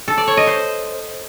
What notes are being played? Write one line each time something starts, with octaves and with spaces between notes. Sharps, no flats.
A4
D5
C#5
D#5
C5